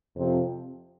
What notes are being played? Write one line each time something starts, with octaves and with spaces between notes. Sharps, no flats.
F2 C3 F3 C4